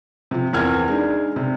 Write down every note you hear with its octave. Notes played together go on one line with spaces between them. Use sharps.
C3 F3
E2 C4 A#4 F6 G#6
G#3 D4 D#4
C3